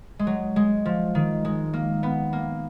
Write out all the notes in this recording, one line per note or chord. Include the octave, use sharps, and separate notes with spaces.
G#3
F#3
G#3
F3
D#3
G#3
A#3
B3
A#3